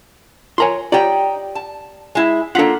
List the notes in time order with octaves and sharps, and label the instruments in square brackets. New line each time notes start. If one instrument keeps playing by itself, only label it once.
[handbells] F4 A#4 G#5 [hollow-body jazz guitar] C#5 A#5 C6
[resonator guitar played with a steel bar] D#4 G5 [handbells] F4 C#5 [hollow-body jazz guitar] G4 D5
[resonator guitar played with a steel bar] A5
G#3 E4
[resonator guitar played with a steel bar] A#3 F4 [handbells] D4 B6 C7 [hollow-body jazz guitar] A4 F#5